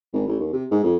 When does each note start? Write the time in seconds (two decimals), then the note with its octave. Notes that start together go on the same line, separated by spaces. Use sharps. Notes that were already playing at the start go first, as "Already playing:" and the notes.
0.13 G#1
0.27 A1
0.40 D#2
0.53 C3
0.71 G#2
0.84 F2